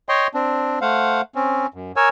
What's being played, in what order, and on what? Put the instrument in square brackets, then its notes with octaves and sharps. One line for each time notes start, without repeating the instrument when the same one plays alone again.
[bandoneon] C#5 D#5 G5 C6
C4 D4
A3 C5 F5 F#5
C4 C#4
F#2
A#4 C#5 G#5 E6